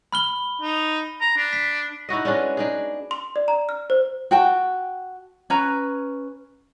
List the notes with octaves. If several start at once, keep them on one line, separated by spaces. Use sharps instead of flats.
B5 F6 G7
D#4
A#5
D4
B6
D#4 E4 F#4 D#5
G#3 B3 C#4 D4
D4 D#4 G#4
C6
D5
A#5
F6
C5
F#4 G5 A5
C#4 B4 A#5